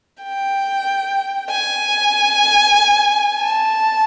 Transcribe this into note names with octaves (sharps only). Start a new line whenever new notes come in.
G5
G#5
A5